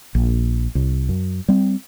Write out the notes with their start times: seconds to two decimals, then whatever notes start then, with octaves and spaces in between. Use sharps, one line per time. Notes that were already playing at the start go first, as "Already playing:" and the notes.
0.15 A#1
0.75 C2
1.09 F#2
1.48 G3 C4